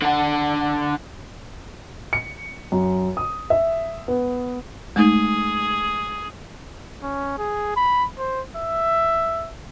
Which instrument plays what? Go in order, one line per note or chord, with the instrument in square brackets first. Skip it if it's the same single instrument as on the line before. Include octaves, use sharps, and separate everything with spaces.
[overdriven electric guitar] D3 F#5
[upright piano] C#7
F#2
D#6
E5
B3
[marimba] G#3 A3 D#4 [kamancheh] G#4
[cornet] C#4
G#4
B5
C5
E5